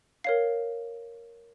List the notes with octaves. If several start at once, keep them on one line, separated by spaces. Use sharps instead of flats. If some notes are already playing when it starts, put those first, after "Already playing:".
A#4 C#5 F5 C7